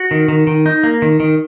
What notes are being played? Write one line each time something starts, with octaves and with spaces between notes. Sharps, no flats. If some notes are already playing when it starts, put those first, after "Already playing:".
Already playing: F#4
D#3
D#3
D#3
D#4
A#3
D#3
D#3